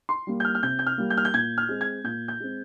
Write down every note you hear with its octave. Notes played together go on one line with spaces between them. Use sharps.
C6
G3 A#3
G6
F6
F6
C3 G6
G6
F6
G3 A#3
G6
F6
G6
A#2 G#6
F6
G#3 C4
G#6
A#2 G6
G6
G#3 C4